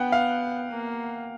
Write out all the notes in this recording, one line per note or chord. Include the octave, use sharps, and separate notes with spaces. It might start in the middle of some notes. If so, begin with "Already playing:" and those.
Already playing: B3 F#5 G5
F5
A#3